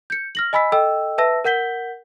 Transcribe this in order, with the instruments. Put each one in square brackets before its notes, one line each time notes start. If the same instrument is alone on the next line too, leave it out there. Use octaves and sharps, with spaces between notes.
[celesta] G6 C#7
F6 A#6 F#7
D#5 G#5 B5 E6 B6
A4 D#5 G5 E6
B4 E5 A5 E6 A#6
A#4 F#5 G6 B6 G7